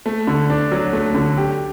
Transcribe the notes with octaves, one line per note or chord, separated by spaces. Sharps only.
A3
D3
D4
F#3
A3
D3
G4